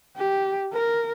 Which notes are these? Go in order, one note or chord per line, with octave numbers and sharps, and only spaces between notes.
G4
A#4